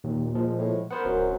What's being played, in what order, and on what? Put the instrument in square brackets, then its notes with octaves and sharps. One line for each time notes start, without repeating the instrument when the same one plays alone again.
[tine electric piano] D#2 [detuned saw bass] A#2
[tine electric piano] F3 G#3
[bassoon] A2
[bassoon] B3 [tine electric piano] A#4 C5 F#5
[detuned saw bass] D1 [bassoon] F#2